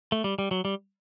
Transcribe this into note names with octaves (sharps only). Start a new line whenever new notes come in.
A3
G3
G3
F#3
G3